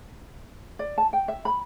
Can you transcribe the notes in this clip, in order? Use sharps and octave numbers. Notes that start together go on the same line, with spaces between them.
D5
A5
G5
E5
B5